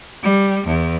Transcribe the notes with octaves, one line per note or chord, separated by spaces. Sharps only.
G3
E2